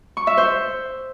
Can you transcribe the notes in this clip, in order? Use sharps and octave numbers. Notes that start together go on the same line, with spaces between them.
C#6
E5
C5